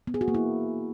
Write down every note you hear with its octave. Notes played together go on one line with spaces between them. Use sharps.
B3
G#4
F#4
A#3
E4